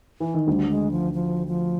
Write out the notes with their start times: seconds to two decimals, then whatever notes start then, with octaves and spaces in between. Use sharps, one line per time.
0.20 E3
0.34 D#3
0.47 D2 D3 G3
0.69 G#3
0.91 F3
1.13 F3
1.47 F3